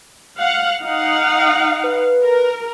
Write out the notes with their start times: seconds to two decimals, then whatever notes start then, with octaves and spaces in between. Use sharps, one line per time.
0.38 F5 F#5
0.83 D#4 F5 F#5
1.84 B4
2.22 A#4